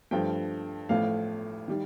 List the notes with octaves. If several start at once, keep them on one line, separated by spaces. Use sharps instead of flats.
G2 F3 A3 G5
A1 A2 F3 A3 F5
D#3 G3